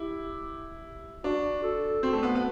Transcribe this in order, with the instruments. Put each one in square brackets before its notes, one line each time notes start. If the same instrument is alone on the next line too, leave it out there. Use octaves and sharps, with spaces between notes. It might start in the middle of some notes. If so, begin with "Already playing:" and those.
Already playing: [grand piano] E4 [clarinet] G4
[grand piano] D4 [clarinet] F#4
[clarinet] A4
[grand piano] C4 [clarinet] F#4
[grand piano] A3
B3
B3